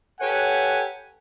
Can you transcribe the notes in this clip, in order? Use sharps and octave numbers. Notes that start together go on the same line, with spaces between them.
G4 A4 B4 C#5 F#5 G#5